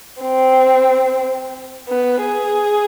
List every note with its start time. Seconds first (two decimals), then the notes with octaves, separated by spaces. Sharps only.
0.21 C4
1.89 B3
2.21 G#4